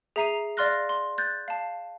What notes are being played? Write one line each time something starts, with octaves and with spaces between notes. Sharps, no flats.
G#4 E5 A#5 C7 D#7 F7
D5 F5 C6 F6 F#6 A#6
C6
F#6 G6 A6
F5 A5